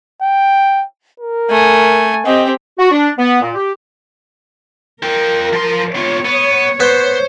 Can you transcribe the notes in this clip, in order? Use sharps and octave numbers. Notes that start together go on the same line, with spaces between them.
G5
A#4
A3 G#5
C4 G4 D#5
F#4
D4
B3
A#2
G4
F4 A#4 G5
F3 C6
B3 F4 C#5
B3
B3 C5